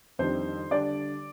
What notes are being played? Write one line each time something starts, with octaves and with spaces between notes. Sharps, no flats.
F2 D#3 G3 D4 C5
D3 G3 D4 D5